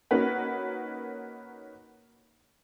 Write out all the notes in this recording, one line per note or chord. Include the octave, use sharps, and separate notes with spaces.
A#3 C#4 D#4 F#4 A#4 B4